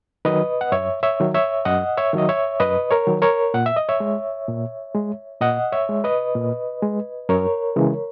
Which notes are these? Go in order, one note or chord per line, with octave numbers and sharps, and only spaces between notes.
D#3 F#3 B4 D#5
F#5
F#2 C#5 E5
C#5 E5
D#3 F#3
C#5 E5
F#2 D#5 F#5
C#5 E5
D#3 F#3 D#5
C#5 E5
F#2 B4 D#5
A#4 C#5
D#3 F#3
A#4 C#5
A#2 F#5
E5
D#5
C#5 E5
G#3
A#2
G#3
A#2 D#5 F#5
C#5 E5
G#3
B4 D#5
A#2
G#3
F#2 A#4 C#5
C#3 E3 G#3